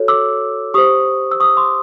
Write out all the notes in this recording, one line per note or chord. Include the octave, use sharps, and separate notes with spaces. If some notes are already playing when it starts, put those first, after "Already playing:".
Already playing: F#4 A4 C#5
D6 E6
G4 C5 C#6 D#6
E6
C#6 D#6
C6 D6